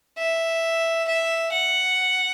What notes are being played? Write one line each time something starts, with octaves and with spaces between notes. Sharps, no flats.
E5
E5
F#5